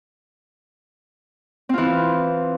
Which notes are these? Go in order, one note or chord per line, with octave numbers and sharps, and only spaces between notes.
E3 C4 F4